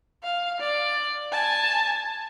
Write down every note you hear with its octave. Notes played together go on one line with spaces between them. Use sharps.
F5
D5
G#5 A5